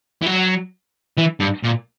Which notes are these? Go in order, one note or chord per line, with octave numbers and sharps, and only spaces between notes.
E3
F#3
E3
G2
A#2